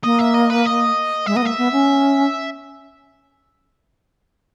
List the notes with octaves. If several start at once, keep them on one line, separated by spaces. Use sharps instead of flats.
A#3 D#5
E5
D#5
B4
D#5
G#3 E5
B3 D#5
A#3 E5
B3
C#4